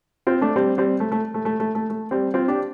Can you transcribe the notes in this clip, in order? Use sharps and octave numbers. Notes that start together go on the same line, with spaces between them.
C4 F4
A3 D4
G3 C4
G3 C4
A3
A3
A3
A3
A3
A3
A3
G3 C4
C4 F4
D4 G4